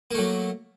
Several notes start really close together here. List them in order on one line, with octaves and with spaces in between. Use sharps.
A#3 A3 F#3